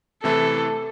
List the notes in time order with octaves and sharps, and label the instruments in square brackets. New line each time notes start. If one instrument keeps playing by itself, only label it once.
[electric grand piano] C3 E3 A3 E4 [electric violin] A4